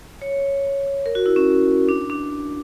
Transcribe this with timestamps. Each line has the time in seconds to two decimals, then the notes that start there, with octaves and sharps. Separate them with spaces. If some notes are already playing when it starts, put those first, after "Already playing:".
0.22 C#5
1.06 A#4
1.15 F#4
1.26 E4
1.36 C#4
1.89 D4
2.10 D4